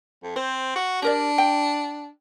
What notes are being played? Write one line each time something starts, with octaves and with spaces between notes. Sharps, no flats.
F2
C4 C5
F#4
D4 G4 A#4 D5
G5